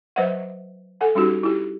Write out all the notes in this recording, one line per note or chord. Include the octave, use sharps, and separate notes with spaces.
F#3 B4 C5 D#5 E5 F#5
A4 F#5 G#5
G3 C#4 D#4 F#4 G4
E4 G4